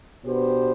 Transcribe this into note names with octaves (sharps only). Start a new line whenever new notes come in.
B2 B3 D4 G4 C5